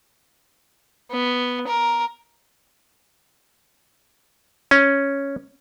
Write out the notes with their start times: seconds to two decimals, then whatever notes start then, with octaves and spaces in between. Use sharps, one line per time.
1.11 B3
1.67 A#4
4.71 C#4